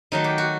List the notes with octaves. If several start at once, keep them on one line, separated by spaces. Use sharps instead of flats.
D#3 F#3 A3 D#4
G4
F#4